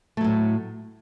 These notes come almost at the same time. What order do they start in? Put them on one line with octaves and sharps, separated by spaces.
A3 F#3 A2